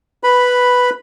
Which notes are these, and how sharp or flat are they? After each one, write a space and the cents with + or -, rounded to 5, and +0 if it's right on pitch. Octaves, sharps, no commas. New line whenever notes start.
B4 +0 B5 +0